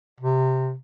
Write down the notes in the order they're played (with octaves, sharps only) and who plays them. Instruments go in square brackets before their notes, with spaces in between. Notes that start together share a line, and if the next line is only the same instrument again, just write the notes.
[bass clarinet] C3